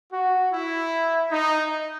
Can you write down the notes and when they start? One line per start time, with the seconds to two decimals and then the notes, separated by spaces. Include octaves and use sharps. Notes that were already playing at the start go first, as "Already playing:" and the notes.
0.12 F#4
0.52 E4
1.31 D#4